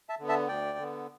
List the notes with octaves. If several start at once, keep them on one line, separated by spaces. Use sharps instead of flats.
E5 A5
D3 B3
E5 A5
D2 D5 G5
D3 B3